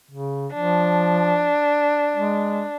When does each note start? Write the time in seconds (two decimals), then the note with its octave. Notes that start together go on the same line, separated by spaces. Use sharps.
0.11 C#3
0.54 F3 D4
2.16 G#3